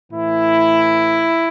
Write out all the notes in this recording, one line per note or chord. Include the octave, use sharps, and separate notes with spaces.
A2 E3 E4